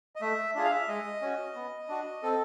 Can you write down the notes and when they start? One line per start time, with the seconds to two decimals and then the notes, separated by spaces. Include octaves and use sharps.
0.16 D#5
0.21 A3 E5
0.55 D4 F4 G#4 E5
0.64 F5
0.71 E5
0.88 G#3 D#5
1.22 C#4 F#4
1.55 B3
1.89 D4 F#4
2.23 C4 A4